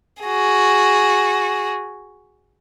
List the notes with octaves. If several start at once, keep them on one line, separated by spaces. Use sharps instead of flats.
F#4 G#4